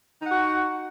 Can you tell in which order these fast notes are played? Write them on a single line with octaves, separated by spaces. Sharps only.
D#4 F#5 F#4